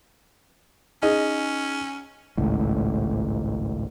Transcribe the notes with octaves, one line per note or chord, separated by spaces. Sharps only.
C#4 D#4 G#4 D#5
G#1 C#2 A2